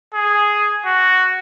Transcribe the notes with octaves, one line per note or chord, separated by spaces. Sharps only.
G#4
F#4